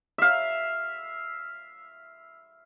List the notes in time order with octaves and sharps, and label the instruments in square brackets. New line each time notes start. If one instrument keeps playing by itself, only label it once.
[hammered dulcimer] E5 F5